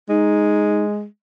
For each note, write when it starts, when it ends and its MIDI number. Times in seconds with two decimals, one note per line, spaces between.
0.09 1.05 56
0.09 0.84 63